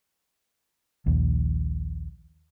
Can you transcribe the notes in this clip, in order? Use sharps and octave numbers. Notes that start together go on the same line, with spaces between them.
A#1 D#2